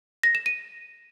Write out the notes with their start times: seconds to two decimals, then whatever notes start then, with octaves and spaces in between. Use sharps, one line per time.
0.23 A#6
0.35 E7
0.46 D#7